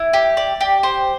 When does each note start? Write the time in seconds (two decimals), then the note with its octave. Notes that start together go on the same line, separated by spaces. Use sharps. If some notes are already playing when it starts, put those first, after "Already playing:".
Already playing: E4
0.13 G4
0.37 D5
0.61 G4
0.83 C5